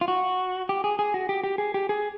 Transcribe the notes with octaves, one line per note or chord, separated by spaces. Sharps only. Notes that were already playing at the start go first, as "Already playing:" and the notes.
F4
F#4
G4
G#4
G#4
F#4
G4
G4
G#4
G4
G#4